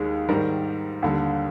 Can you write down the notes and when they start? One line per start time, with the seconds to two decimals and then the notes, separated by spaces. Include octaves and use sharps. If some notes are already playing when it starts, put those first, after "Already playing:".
Already playing: D#2 D#3 G#3
0.29 G#2 D#3 G3 A#4
1.02 D#2 D3 G3